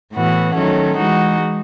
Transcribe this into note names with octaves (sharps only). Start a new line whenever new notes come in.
A2 E3 B3 F#4
D#3 F#3 A3 C#4
E3 G#3 D#4 F#4